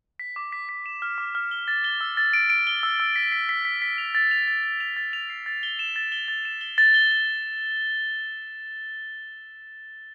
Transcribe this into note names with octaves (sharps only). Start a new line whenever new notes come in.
B6
D6
B6
B6
E7
F6
D6
F6
G7
A6
G7
E6
A6
D7
D7
G7
E6
E6
B6
B6
B6
B6
B6
F7
A6
F7
A6
A6
F7
A6
F7
C7
A6
G7
E7
A6
G7
A6
E7
G7
A6
G7
A6